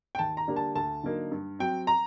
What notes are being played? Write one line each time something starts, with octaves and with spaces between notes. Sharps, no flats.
G5
D#2 A5
A#5
D3 G3 A#3 D4
A5
D2 A5
D3 F#3 A#3 D#4
G2
F#3 C4 G5
A#5